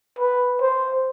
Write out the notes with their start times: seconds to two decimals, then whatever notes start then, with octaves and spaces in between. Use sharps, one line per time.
0.19 B4
0.61 C5